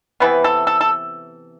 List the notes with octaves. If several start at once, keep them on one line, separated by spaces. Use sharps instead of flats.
C3 E3 B3 B4
A4
A4
A4